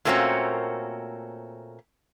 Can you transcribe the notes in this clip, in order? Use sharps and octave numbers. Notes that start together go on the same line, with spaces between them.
A#2 A3 A#3 C4 C#4 F#4